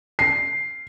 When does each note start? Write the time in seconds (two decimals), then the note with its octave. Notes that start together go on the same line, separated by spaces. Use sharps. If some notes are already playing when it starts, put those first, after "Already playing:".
0.19 C7